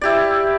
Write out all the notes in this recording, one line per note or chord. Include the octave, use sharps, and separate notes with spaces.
E4 G4 D5